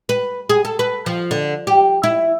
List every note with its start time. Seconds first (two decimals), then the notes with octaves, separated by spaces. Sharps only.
0.09 B4
0.50 G#4
0.65 A4
0.79 B4
1.06 F3
1.31 D3
1.67 G4
2.04 E4